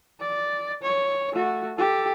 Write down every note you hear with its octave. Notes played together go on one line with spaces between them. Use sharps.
D5
C#5
A3 F#4
G4 A4